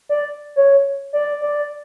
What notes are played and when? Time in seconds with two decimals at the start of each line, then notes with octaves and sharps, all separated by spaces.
0.09 D5
0.56 C#5
1.13 D5
1.41 D5